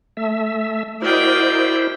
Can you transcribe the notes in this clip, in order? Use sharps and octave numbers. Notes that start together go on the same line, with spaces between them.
A3 E5
E4 F#4 A#4 C5 D5 D#5 G5